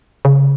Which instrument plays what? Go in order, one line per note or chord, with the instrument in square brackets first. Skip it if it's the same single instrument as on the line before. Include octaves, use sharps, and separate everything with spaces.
[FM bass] C#3